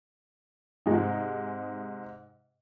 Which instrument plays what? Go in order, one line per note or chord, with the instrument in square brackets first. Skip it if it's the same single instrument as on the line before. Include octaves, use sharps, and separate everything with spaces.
[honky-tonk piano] G#2 C3 G#3 D#4